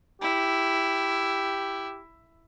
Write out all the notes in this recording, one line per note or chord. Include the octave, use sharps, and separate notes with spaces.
E4 G4